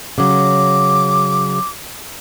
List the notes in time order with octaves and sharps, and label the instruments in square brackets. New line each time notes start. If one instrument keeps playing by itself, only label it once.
[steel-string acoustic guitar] C#3 F#3 [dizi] D6